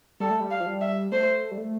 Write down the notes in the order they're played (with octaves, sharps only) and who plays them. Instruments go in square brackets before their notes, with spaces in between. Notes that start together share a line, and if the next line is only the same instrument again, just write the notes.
[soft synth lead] G3 [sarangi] A4
[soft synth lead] A3
G3
[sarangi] F5
[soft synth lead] F3
G3
[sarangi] E5
[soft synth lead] A3 [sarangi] C5
[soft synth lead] G3
A3